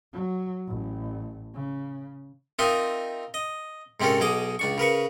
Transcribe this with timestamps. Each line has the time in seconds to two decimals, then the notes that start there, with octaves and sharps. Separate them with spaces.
0.13 F#3
0.68 A1
1.54 C#3
2.59 C4 D#4 F4 A#4 D#5 E5
3.34 D#5
4.00 G#2 C3 C4 C#4 A4 A#4
4.20 B1 B2 G#4 D#5 D6
4.59 C#2 D4 C#6
4.78 C#3 A#4 B4 C#6